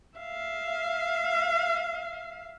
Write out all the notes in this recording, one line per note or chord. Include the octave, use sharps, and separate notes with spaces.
E5 F5